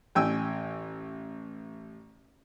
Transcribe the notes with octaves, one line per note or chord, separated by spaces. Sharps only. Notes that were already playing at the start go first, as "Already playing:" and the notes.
A1 G5 G#5 E6